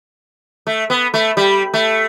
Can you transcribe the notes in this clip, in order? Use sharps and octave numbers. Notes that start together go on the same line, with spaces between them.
A3
B3
A3
G3
A3